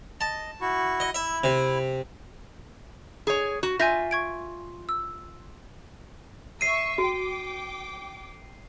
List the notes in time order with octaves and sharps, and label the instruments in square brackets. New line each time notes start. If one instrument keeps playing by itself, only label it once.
[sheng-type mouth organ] D#5 [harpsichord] A5
[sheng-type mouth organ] E4 F#4 C#6
[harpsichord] D#5
[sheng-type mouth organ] E4 [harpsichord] E5
[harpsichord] C3
[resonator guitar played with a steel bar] G#4 C#5
F#4
[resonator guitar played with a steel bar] F4 E5 [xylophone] G#5 G6 A#6
[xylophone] C#6 G#6 D7
E6
[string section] E5 C#6 [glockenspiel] C7 D#7
[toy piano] F#4 [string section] G5 D6